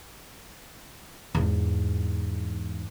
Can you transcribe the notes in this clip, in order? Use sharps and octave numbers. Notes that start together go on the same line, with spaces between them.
E2 G#2